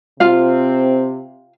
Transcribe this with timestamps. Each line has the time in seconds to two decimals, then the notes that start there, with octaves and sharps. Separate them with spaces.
0.20 C3 C4 F4 F5